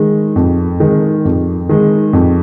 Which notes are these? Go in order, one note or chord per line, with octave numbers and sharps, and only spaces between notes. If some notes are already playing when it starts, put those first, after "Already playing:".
Already playing: D#3 G#3
F2
D#3 G#3
F2
D#3 G#3
F2